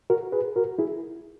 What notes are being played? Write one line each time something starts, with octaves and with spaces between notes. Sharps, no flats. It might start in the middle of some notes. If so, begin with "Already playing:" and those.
F#4 A#4
G#4 B4
F#4 A#4
E4 G#4